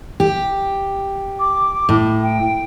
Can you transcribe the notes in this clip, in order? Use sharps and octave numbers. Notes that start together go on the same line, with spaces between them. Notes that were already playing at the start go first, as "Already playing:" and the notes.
G4
D6
A2
G5